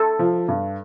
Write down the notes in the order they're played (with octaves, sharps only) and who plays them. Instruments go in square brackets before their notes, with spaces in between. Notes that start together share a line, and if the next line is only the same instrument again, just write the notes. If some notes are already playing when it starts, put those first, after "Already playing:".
Already playing: [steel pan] A4
[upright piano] F3
G2